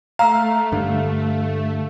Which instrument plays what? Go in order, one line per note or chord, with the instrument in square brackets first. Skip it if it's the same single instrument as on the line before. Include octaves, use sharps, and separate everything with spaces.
[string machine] A3 [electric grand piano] F5 [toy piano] A#5 E6
[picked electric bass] G2 D3